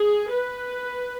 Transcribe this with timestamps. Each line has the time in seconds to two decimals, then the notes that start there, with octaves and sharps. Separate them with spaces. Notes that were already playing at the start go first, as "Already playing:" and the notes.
Already playing: G#4
0.31 B4